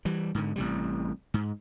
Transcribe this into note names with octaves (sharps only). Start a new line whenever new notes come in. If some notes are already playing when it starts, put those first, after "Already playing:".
E3 G3
G#2 D3
A1 C3 G3
G#2